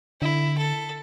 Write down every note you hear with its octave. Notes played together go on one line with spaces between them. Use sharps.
D3 E4
A4